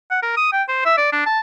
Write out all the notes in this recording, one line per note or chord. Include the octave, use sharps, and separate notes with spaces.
F#5
A#4
D#6
G5
C5
E5
D5
D4
A5